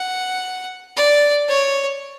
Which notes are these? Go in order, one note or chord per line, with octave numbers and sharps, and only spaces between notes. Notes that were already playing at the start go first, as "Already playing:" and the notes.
Already playing: F#5
D5
C#5